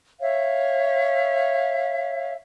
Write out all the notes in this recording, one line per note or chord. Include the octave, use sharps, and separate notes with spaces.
C#5 E5 F5